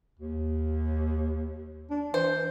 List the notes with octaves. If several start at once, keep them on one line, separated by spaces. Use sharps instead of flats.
D#2
D4
E3 C5